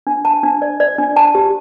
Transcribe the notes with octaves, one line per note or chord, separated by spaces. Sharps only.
D4
A5
D4
D5
D5
D4
A5
G4